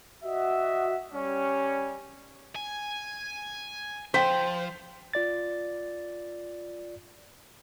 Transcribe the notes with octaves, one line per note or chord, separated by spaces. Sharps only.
F#4 D#5 E5
G3 C#4
G#5
F3 C5 G5 B6
F4 D5 A6